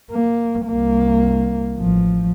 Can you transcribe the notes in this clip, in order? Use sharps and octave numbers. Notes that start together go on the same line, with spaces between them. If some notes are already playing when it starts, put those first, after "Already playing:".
A#3
C2 A#3
A1 F3